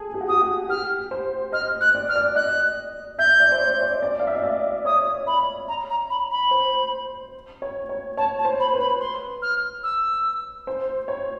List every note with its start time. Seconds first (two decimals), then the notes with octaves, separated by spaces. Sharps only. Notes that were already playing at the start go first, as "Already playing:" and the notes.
Already playing: G#4 A4
0.14 G4
0.21 F#4
0.28 G4 D#6
0.41 F#4
0.69 G4 F6
1.11 C5
1.52 D#5 F6
1.80 F#6
1.95 D5
2.08 F6
2.15 D5
2.35 D#5 F#6
3.18 E5 G6
3.40 D5
3.52 C5
3.60 C#5
3.81 D5
3.94 D#5
4.02 D5
4.19 F5
4.27 E5
4.35 D#5
4.43 D5
4.85 C#5 D#6
5.26 B5
5.68 A#5
5.89 A#5
6.10 B5
6.31 B5
6.51 C5
7.62 C#5
7.89 C#5
8.17 C#5 A5
8.38 A5
8.45 C5
8.60 B5
8.73 B4
8.80 B5
9.00 C6
9.42 F6
9.83 E6
10.67 C5
11.08 C#5